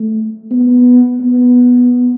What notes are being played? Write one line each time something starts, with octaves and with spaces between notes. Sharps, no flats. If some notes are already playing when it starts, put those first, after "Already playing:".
Already playing: A3
B3
B3